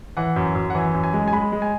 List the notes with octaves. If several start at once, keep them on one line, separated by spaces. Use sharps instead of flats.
E3 F#5
F#2
F#2
F#5
E3 G#5
F#2
G#5
G#3
G#5
G#3 B5
G#3
G#5